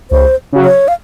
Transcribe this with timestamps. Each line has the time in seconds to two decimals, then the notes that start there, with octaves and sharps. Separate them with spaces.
0.11 C#2 C5
0.53 C#3 F#3
0.65 C#5
0.88 F5